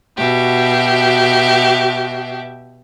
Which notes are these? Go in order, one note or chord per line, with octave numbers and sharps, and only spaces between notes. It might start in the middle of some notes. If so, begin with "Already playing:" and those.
B2 F#4 G4 E5